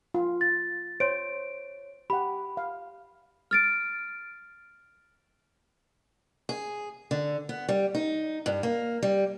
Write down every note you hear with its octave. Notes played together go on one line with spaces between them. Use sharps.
F4
A6
C5 C#5 D7
G4 F#5 B5
F5
F6 A6 D7
G#4
D3
B3
G3
D#4
G2
A#3
G3